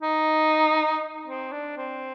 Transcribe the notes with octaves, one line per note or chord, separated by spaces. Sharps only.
D#4
C4
D4
C4